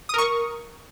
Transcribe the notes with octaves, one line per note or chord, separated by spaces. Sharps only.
A#4 C#6 D#6